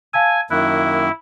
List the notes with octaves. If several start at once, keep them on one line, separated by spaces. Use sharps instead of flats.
F5 G#5 A5 E6
F#2 D#3 A#3 E4 F#6